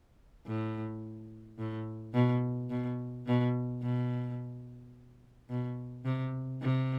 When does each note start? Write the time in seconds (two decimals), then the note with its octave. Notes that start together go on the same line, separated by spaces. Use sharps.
0.47 A2
1.58 A2
2.14 B2
2.70 B2
3.26 B2
3.82 B2
5.50 B2
6.05 C3
6.62 C3